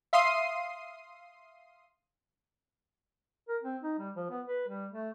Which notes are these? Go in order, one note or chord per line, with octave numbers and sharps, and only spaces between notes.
E5 F5 C6 D#6 C7 D#7
A#4
C4
D#4
G3
F3
B3
B4
G3
A3